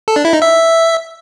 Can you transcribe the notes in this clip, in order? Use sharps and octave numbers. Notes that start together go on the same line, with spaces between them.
A4
D4
E4
D#4
E5